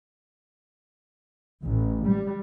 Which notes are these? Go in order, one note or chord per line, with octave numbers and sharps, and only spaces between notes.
A1
G3